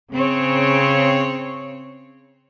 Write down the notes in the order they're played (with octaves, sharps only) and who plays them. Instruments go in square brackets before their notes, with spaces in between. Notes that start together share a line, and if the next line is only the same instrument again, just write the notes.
[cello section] C#3 C4 C#5